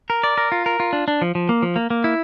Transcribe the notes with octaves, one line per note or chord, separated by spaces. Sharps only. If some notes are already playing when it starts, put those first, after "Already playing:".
A#4
D5
A#4
F4
A#4
F4
D4
D4
F3
F3
A#3
F3
A#3
A#3
E4